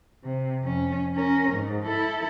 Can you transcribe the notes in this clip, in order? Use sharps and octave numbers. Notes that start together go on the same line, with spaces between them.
C3
F2 C#4
C#4 A#4
G#2
E4 A4